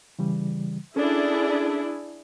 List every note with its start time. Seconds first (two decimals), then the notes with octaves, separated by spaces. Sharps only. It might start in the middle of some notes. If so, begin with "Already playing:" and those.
0.19 C#3 E3 G3
0.96 C#4 D4 E4 G#4 A4